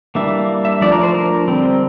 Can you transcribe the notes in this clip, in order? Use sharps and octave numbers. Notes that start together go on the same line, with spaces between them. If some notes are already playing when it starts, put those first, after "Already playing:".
E3 G3 A#3 D4 E5
E5
F3 A3 D4 D5
A#4
C5
A#4
D3 G3 C4